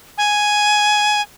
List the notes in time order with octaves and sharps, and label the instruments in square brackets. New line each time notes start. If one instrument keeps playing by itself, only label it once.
[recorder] G#5